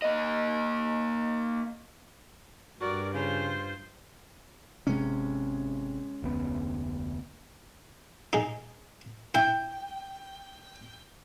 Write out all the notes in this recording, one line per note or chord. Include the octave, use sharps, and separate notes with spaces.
A#3 D#5
G2 F#4 A#4 D5
C#3 F4 C5
G#1 C3 G#3 C#4
F1 D2 B3
D#4 G#4
E4 G5